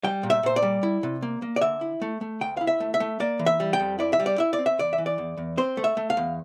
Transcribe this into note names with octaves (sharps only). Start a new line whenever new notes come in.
G3 G5
A#2
E5
A#2 C5
D5
G3
E4
C3
A#3
A#3
D5
D3 E5
E4
A3
A3
D2 G5
E4 F5
E5
A3
E5
A3
A#3 D5
E3
E5
G3
G5
F2
E4 D5
E5
G3
D5
E4 E5
D5
C4
E5
E2 D5
E5
E3
D5
E2
E2
C4 C5
A3
E5
A3
F5
E2